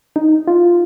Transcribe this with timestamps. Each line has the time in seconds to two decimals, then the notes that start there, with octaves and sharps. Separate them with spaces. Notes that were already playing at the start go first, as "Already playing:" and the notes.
0.16 D#4
0.47 F4